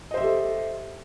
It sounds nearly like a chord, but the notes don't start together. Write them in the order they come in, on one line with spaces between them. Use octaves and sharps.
D#5 C5 E5 G4 A4